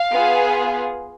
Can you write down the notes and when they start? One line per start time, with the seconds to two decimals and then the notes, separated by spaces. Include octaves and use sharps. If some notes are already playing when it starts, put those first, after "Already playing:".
Already playing: F5
0.12 B3 F4 G#4